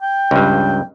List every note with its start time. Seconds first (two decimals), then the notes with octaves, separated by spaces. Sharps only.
0.02 G5
0.31 C#2 G2